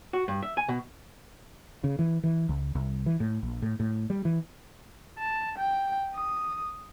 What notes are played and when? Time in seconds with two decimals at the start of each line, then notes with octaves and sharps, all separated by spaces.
0.13 F#4
0.28 G2
0.43 E5
0.57 G#5
0.69 B2
1.84 C#3
1.99 E3
2.23 E3
2.49 C#2
2.75 C2
3.06 E3
3.20 A2
3.43 A#1
3.62 A2
3.80 A2
4.10 G3
4.25 E3
5.18 A5
5.58 G5
6.15 D#6